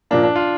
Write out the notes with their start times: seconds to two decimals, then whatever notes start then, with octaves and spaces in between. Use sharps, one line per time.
0.11 A#2 F3 A#3 D4
0.23 D4
0.36 F4